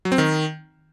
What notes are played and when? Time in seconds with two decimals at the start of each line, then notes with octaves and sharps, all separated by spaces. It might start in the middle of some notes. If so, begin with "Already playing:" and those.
0.05 F#3
0.12 C4
0.18 D#3